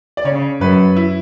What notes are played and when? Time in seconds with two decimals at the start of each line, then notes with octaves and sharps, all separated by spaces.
0.17 D5
0.25 C#3 C#5
0.61 F#2 B4
0.96 E4